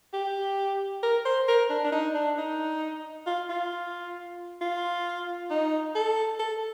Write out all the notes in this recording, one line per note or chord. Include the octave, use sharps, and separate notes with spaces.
G4
A#4
C5
A#4
D4
D4
D#4
D4
D#4
F4
F4
F4
D#4
A4
A4